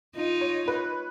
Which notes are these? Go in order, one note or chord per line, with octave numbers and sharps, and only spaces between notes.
D#4 F4
C#5
B4